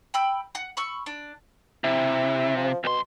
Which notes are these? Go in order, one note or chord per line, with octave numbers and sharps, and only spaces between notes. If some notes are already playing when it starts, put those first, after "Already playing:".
G5 B5 E6
F#5
B5 C#6 E6
D4
C3 E4
F3
C2 B2 C6